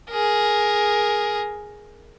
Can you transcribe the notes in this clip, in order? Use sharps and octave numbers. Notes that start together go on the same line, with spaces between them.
G#4 A#4